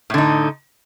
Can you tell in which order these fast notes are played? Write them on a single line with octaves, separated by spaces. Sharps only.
A2 D3 D#4